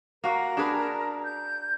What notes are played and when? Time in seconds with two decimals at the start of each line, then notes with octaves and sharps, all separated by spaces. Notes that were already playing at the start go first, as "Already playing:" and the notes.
0.24 A#3 F#4 A#4 A#5
0.57 D4 G#4 B4
1.23 G6